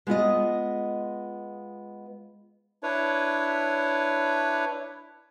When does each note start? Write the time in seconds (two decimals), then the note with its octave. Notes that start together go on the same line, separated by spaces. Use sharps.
0.07 G#3 B3 F4 D#5
2.83 D4 E4 B4 C#5